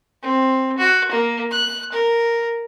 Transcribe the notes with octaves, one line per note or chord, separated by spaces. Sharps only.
C4
F#4
A#3
F#6
A#4